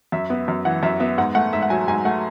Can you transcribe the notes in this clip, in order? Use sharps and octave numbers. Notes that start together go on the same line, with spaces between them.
F#2 E5
B3
F#2
E3 F#5
F#2 E5
B3 E5
G#2 F#5
A3 F#5
G#2 E5
F#5
F#3 G#5
G#2 G#5
A3 F#5